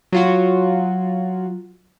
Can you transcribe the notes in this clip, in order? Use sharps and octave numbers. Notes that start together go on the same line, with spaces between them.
F#3 F4 F#4